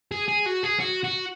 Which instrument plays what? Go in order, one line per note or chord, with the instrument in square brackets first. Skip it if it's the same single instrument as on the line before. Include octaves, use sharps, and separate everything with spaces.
[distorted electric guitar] G#4
G#4
F#4
G#4
F#4
F#4